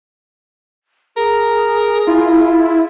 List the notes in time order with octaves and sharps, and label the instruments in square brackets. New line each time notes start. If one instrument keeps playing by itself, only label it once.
[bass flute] G#4 [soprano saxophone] A#4
[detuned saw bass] E4 [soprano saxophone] F4